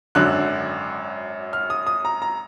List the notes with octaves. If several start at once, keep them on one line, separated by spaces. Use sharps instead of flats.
G#1 F#2 D3 F#6
F6
D#6
D#6
A#5
A#5